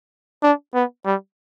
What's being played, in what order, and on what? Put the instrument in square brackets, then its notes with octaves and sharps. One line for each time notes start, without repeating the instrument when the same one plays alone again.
[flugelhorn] D4
B3
G3